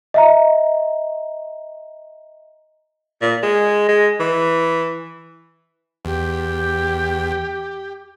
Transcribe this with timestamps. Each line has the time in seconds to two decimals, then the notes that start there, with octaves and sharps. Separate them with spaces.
0.14 D#5 E5 A#5
3.21 A#2
3.43 G#3
3.89 G#3
4.20 E3
6.05 E2 G4